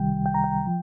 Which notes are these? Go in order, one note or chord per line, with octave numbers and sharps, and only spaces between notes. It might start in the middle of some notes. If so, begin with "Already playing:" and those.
Already playing: C2 C3 D#3 G3 G5
G5
A#5
G5
F3